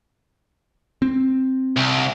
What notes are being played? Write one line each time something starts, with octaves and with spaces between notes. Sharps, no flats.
C4
C2